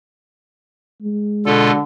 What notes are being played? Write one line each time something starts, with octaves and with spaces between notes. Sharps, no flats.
G#3
B2 D3 F4 A4